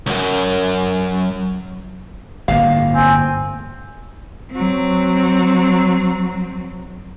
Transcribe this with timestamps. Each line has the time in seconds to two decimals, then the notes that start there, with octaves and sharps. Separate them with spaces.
0.06 C#2 F#2
2.48 G1 A2 A#3 F5
2.94 C4 G#5
4.52 F#3 C4